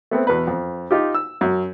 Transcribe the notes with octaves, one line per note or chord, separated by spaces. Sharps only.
A3 B3 C4
E2 B2 B4
F2
D#4 F4 G4
E6
F#2